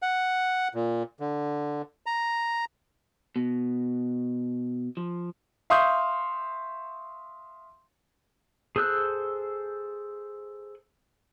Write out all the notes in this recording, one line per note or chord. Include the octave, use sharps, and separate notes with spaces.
F#5
A#2
D3
A#5
B2
F3
E5 F5 C6 C#6 D#6 G6
G#4 A4 C5 E6 F#6